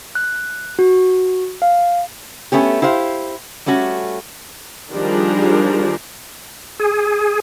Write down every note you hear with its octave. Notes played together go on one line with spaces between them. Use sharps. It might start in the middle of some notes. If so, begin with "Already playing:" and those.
F#6
F#4
F5
A3 B3 C#4 G4
E4 G4 C5 F5
G3 A3 C#4 F#4
D#3 F3 G3 D4 G#4 A#4
G#4